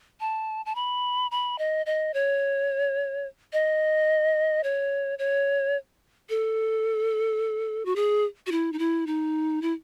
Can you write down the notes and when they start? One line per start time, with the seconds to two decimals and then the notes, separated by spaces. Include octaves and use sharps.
0.20 A5
0.66 A5
0.75 B5
1.31 B5
1.59 D#5
1.86 D#5
2.14 C#5
3.53 D#5
4.63 C#5
5.19 C#5
6.29 A4
7.85 F#4
7.96 G#4
8.47 F#4
8.51 E4
8.73 D#4
8.79 E4
9.07 D#4
9.62 E4